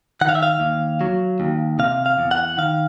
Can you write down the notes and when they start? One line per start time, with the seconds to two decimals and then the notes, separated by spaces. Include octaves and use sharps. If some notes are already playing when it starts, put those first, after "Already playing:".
0.21 D#3 F#5
0.29 F5
0.35 E5
0.43 F5
0.60 D#2
1.01 F#3
1.40 D#2
1.79 C3 F5
2.06 F5
2.19 E2
2.31 F#5
2.58 D#3 F5